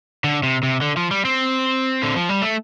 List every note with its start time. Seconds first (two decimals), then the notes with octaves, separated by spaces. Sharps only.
0.24 D3
0.43 C3
0.63 C3
0.81 D3
0.97 F3
1.11 G3
1.25 C4
2.03 D3
2.16 F3
2.29 G3
2.42 A3